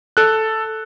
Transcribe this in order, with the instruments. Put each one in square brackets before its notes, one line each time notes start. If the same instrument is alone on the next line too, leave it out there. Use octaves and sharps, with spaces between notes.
[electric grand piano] A4 F#6